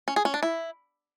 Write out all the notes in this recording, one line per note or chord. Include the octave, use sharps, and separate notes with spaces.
C#4
G#4
C#4
D4
E4